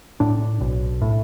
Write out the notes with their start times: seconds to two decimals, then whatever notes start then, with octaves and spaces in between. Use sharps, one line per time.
0.20 A2 D4
0.61 B1
1.02 A2